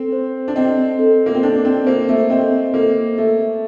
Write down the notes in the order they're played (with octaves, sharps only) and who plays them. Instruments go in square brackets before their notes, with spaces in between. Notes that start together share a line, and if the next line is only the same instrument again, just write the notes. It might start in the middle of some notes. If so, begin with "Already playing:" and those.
Already playing: [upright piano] C4 [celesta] A4
[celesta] C5
[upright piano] D4
[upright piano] C4 [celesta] D#5
[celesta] A4
[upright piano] A#3
C4
[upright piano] D4 [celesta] A4
[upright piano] C4
[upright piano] A#3 [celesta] C5
[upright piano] A3
[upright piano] C4 [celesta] D#5
[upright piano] A#3 [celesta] A4
[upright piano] A3 [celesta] A4